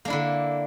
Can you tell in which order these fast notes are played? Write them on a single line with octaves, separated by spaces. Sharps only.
A#3 D4 E4 D3